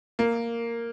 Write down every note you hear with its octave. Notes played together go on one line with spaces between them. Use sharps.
A#3